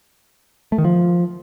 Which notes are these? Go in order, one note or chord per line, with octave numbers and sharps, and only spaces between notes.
A3
D#3
F3